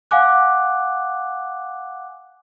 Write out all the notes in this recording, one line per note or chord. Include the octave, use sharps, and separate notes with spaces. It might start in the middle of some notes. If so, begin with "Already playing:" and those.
F5 F#5 G#5 D6 F#6